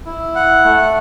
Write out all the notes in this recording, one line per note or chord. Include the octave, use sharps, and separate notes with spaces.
E4
F#5
A3